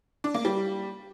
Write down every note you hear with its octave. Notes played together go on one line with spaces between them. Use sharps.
D4
A#3
G3